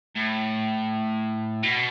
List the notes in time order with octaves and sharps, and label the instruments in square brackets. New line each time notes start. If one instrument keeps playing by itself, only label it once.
[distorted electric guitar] A2
B2